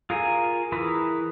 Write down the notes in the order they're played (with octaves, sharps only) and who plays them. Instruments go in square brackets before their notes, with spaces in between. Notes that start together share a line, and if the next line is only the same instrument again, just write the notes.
[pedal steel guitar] F4 G#4 A#4 F5 G#5
E3 E4 G#4 A#4 B4